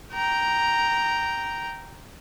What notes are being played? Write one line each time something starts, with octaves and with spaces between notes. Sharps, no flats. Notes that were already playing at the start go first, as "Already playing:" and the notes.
G5 A#5